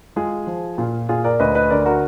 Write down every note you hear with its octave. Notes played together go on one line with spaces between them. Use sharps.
G#3 F4 G#4
F3
A#2 F4
A#2 F4 G#4
A#4 D5
D2 B4 D#5
B4 D#5
D3 A#4 D5
F#4 A#4